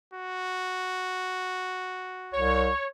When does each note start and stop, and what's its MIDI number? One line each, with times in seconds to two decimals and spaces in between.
0.14 2.50 66
2.34 2.69 36
2.34 2.87 73